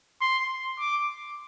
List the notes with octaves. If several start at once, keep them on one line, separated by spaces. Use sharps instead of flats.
C6
D6